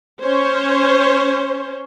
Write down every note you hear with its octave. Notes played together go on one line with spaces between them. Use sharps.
C#4 C5 C#5